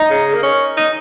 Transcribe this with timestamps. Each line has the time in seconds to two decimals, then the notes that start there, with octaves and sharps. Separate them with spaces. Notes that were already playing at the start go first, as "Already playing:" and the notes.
Already playing: D#4
0.10 C#3
0.34 A#3
0.43 C#4
0.77 D#4